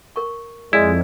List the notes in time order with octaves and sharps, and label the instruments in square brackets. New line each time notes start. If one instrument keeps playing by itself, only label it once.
[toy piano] A#4 C#6
[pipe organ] F2 [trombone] G#3 [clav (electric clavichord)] E4 [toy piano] D5 D#5